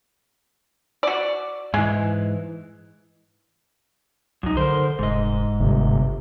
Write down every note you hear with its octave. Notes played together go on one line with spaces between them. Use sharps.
F#4 D5
G#2 E3 G#3
C2 F#2 D#4
D3 A#4 C5
F1 G#2 D#5
G1 C3